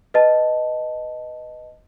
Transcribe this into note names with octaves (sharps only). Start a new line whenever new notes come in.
B4 D#5 A5